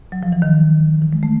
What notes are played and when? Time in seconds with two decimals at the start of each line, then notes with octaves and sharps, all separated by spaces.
0.12 F#3
0.23 F3
0.32 E3
0.42 D#3
1.02 E3
1.13 G#3
1.23 A3